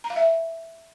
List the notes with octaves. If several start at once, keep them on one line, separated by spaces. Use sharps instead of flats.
A#5
F5
E5